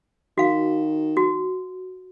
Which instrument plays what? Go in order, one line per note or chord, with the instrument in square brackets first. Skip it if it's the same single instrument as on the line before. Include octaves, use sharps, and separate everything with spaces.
[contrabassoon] D#3 [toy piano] F#4 F5
[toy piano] F#4